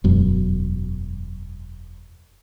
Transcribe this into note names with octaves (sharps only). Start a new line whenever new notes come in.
E1 F#2